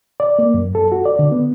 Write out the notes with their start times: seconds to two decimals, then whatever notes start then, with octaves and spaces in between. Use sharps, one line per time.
0.20 D5
0.39 A#3
0.54 F#2
0.75 A4
0.92 F#4
1.05 D5
1.19 D3
1.32 B3